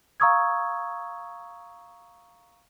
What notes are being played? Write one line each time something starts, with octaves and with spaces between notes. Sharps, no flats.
F5 A#5 C#6 D#6 E6 G#6